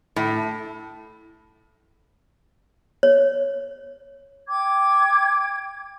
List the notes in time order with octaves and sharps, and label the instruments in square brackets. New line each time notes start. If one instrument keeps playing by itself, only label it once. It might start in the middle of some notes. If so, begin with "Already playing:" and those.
[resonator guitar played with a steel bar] A2
[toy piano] C#5
[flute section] G5 D6 G#6